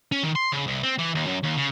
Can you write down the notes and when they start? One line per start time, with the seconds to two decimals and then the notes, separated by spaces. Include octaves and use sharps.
0.12 C#4
0.23 D#3
0.35 C6
0.52 C#3
0.67 C2
0.83 C4
0.99 E3
1.15 D#2
1.27 F#2
1.44 D#2
1.57 C#3